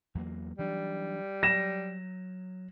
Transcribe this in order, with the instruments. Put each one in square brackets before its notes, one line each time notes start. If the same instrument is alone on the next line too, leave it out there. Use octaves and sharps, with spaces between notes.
[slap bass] E2 F#3 A#3
[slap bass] E3 F#3 D4 [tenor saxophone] G3
[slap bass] F#3 [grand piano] A#6 E7